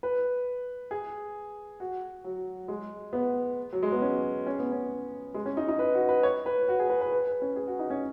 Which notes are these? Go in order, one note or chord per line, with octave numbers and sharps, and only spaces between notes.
B4
G#4
F#4
F#3
G#3
B3
F#3
G#3
B3
C#4
C#4
B3
C#4
G#3
C#4
D#4
D#4
B4
F#4
B4
C#5
B4
F#4
G#4
B4
B4
B4
B4
C#4
G#4
F#4
D#4
C#4